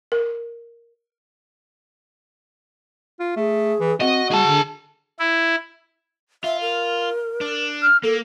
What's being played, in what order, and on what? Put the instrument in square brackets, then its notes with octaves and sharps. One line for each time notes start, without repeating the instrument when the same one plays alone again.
[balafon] A#4
[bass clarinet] F4
[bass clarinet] A3 [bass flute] G#4
[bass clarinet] E3
[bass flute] C4 [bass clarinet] F#4 [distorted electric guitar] D#5
[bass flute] G3 [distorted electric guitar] G#4 A5
[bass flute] D3
[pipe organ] E4
[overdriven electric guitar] F4 [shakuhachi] E5
[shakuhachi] A#4
[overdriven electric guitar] D4
[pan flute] F6
[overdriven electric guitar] A#3 [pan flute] A4